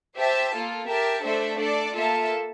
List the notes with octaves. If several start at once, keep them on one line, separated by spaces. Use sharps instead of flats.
G4 C5 E5 A5
A#3 F4 A4
G4 A#4 E5 A5
A3 D4 A4 C5 E5
D4 A4 D5 A5
A#3 F4 A4 E5 A5